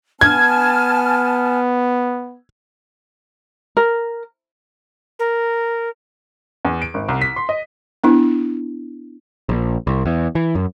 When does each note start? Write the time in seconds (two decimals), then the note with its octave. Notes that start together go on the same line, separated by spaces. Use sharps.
0.21 B3 G#5 A5 F6 G#6
3.77 A#4
5.19 A#4
6.65 E2
6.82 D7
6.94 G#1
7.09 C2
7.21 B6
7.36 C6
7.49 D#5
8.04 B3 D4 E4
9.49 A#1
9.87 C2
10.05 E2
10.35 E3
10.55 F#2